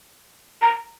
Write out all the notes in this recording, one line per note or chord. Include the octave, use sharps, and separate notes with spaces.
A#5